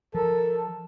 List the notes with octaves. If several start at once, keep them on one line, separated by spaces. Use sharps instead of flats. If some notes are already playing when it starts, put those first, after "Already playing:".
F3 A4 A#4